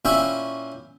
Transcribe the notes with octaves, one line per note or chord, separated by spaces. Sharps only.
A#2 C#4 E4 C#5 E5 G5